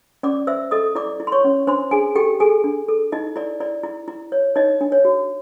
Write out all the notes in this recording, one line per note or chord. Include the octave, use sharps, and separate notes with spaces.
C#4 D5 D6
C5 E5 E6
A4 D#5 D#6
E4 D5 D6
E4
C6
C#5 C#6
C#4
D4 C5 C6
D4 G#4 G#5
G4 A4 G5
G#4 A4 G#5
D4
A4
D#4 E4 D#5
E4 D5
E4 D5
E4
E4
C#5
D#4 C#5 D#5
D4
C#5
F#4